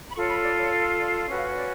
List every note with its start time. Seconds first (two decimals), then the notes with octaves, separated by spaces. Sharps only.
0.10 B5
0.16 F4 A4 C#5 C#6
0.30 B5
0.43 D5
0.57 C#5
0.99 D5
1.28 C#4 F#4 B4 D5
1.37 F5
1.47 C#5
1.56 D5